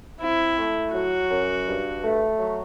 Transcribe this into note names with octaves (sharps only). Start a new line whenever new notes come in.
C4 E4
A3
F#3 F#4
F#2
G2
A3
F#3